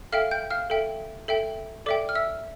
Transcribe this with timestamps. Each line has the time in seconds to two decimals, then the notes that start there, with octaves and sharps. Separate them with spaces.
0.12 A4 E5 F5 G5 F6
0.31 G5 G6
0.50 F5 F6
0.70 A4 E5 G5
1.28 A4 E5 G5
1.86 A4 D5 E5 G5 D6
2.09 F6
2.15 E5 E6